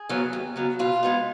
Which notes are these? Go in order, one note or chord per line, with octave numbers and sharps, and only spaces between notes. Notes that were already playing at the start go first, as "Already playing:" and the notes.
Already playing: G#4
C#3 F#3 B3
D#2
C#3 F#3 B3
B2 F4
G#3 B3 D#4